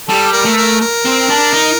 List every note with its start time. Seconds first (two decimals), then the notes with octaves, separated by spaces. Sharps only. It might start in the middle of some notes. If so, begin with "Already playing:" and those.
0.09 G3 A4
0.33 A#4
0.45 A3
0.57 A#4
0.81 A#4
1.05 C4
1.30 D4
1.53 D#4